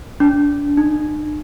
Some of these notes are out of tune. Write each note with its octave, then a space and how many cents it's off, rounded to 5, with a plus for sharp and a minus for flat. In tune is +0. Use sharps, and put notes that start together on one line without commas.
D4 -25
D4 +45